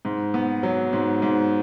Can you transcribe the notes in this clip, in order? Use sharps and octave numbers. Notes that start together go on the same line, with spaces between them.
G#2
B3
F#3
G#2
G#2